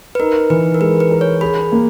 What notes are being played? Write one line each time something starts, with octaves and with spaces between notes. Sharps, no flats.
B4
D#4 A#4
E3 B4
A#4
G#3 B4
B4
A#4
C#5
G#4 B5
A#3